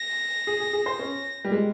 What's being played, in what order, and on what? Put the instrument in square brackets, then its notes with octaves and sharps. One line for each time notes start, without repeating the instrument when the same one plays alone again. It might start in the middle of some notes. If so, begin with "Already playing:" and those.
Already playing: [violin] A#6
[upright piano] G#4
G#4
G#4
C5
C#4
G3
G#3